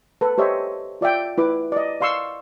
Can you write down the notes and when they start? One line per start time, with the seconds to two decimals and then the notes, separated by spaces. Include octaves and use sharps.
0.21 A4 B4
0.38 G4 C5 C#5 D#5 E5
1.01 F4 D5 E5 G5
1.38 E4 B4 D6
1.72 D5 D#5
2.01 D5 F5 C6 C#6 E6